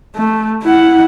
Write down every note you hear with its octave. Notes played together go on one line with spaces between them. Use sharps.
A3
E4 F#5